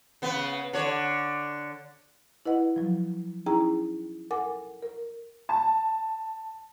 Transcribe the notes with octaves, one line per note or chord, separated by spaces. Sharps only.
C#3 B3
D3 C#5
E4 B4 D#5 F#5
F3 F#3
C#4 D#4 E4 G#4 G5 A#5
A4 A#4 F#5 G#5 D6
A#4
A5